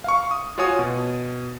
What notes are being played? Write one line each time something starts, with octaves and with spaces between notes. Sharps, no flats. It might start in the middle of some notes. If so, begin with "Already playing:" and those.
F5 C#6
D#6
F4 F#4 C#5 G#5 D#6
B2